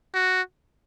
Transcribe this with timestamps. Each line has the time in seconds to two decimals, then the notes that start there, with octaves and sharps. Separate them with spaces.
0.14 F#4